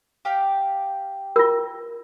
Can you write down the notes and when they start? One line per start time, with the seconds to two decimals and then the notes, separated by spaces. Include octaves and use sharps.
0.25 G4 F5 G5
1.36 F4 A#4